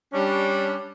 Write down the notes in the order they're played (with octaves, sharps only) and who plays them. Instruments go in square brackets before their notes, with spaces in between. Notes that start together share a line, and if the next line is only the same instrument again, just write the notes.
[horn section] G3 C#4 D4